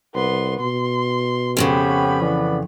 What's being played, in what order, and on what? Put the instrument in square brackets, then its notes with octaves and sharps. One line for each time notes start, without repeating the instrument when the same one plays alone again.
[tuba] C2 [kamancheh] B3 C6
[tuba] B2 [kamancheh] C6
[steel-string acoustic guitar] F2 A2 C#3 [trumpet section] B3 G4 [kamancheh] C#4 B5
[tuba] E3 [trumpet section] B3 B4 D5